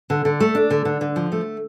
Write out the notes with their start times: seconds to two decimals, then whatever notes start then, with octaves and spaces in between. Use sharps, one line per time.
0.10 D3
0.25 D3
0.40 A3
0.55 D4
0.70 D3
0.85 D3
1.01 D3
1.16 F3
1.32 A3